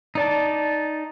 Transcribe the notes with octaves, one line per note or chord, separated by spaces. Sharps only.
D#4 D5 A5